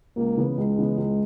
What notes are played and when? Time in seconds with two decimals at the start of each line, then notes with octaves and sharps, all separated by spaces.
0.16 C#2 A#3
0.37 C#3 E3 B3
0.57 C#2 G#3
0.78 C#3 E3 B3
0.97 C#2